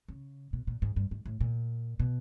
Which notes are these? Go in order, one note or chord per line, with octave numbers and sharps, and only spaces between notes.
C#3
B2
A#2
G#2
G2
G#2
A2
A#2
B2